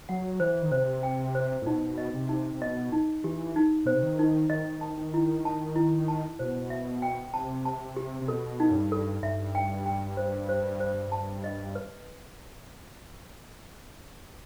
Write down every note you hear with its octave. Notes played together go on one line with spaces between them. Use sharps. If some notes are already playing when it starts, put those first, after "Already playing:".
F#3 F#5
E3 C5
D#3
C3 C5
G5
C5
A2
B2 D#4
D#5
C3
D#4
C3
B2 D#5
D#4
E3 G4
D#4
B2 C5
C3
D#3
D#4
D#3 D#5
A5
D#3
E4
A5
E4
A5
B2 C5
E5
G5
C3 A5
A5
G4
C3
B2 A4
D#4
F#2
G2
A4
G2 E5
G5
G5
C5
C5
C5
A5
D#5
B4